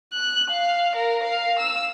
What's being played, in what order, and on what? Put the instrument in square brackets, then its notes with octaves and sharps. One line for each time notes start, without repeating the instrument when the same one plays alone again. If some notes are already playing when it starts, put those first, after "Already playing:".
[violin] F#6
F5
A#4
F5
E6